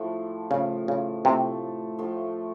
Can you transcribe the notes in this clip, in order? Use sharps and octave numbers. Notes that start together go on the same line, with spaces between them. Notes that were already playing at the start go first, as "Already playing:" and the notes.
Already playing: A2 F3 A3
A2 C#3 F3 A3
C#3
A2 C3 F3 A3
A2 F3 A3